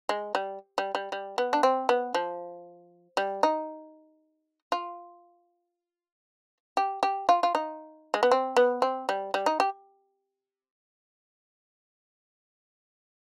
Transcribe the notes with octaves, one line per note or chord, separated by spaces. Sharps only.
G#3
G3
G3
G3
G3
B3
D4
C4
B3
F3
G3
D#4
F4
G4
G4
F4
F4
D#4
G#3
B3
C4
B3
C4
G3
G3
D#4
G4